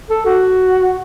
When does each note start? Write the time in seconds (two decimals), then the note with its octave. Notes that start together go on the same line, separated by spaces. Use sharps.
0.09 A4
0.26 F#4